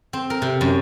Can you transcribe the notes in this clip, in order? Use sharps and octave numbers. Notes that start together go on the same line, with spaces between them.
C4
A#4
C3
F#2